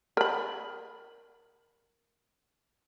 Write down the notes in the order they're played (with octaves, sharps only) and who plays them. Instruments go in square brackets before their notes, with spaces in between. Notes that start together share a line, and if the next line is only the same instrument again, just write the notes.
[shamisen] A#4 B5